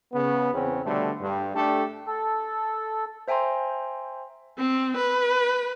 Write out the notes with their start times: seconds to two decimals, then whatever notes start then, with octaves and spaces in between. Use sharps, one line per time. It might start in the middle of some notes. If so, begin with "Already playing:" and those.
0.13 C#3 B3
0.53 E2 C#3 C4 C#4
0.85 B2 D3 G3 A3
1.20 G2
1.55 A3 D4 G4 A4
2.07 A4
3.28 C5 E5 G5 G#5 A#5 C6
4.58 C4
4.97 B4